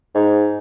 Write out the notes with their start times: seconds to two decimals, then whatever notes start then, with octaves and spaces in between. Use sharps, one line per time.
0.15 G#2